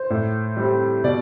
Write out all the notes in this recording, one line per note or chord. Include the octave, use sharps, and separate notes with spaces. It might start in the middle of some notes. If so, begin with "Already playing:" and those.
Already playing: C5
A2
G3 C4
B2 D5